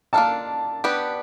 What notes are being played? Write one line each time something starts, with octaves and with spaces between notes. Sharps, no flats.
A#3 D4 F4 A4 A5
B3 D4 G4 B4